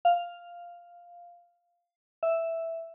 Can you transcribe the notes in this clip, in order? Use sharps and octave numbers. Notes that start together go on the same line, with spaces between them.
F5
E5